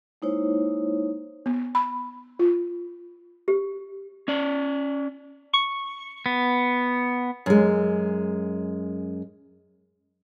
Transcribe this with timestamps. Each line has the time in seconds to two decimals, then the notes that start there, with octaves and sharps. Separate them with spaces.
0.22 G#3 A#3 D#4 E4 C5 C#5
1.46 B3
1.75 B5
2.39 F4
3.48 G4
4.28 C#4 D5
5.54 C#6
6.26 B3
7.46 F#2 G#3